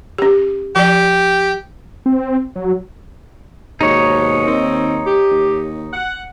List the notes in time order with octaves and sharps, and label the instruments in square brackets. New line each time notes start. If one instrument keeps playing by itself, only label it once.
[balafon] C#4 G4
[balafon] F3 D5 [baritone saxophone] G4
[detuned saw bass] C4
F#3
[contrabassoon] D#2 [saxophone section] G#2 B2 [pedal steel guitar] D#4 C#5
[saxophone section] D#3 C4
G4
[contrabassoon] D#2
[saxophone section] F#5